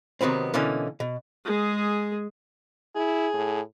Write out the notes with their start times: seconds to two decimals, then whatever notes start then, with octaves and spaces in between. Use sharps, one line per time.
0.21 C3 D#3 F#3 B3 C4
0.54 B2 D3 E3 A#3 C#4
1.00 B2
1.45 G#3 G#4
2.96 E4 G#4
3.34 A2